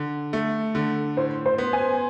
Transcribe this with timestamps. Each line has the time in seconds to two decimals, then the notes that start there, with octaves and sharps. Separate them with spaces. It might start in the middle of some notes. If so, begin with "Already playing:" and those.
Already playing: D3
0.33 A3
0.75 D3
1.17 A2 C5
1.46 C5
1.58 B3
1.73 G#5